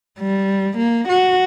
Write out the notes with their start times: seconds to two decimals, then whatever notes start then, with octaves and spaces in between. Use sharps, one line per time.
0.19 G3
0.78 A#3
1.09 F#4